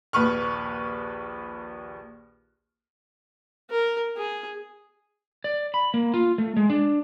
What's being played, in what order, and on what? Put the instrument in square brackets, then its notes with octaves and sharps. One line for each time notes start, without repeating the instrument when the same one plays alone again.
[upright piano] A#1 D#2 B4 C#6 F6
[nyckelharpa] A#4
G#4
[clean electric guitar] D5
B5
A#3
F4
A3
G#3
D4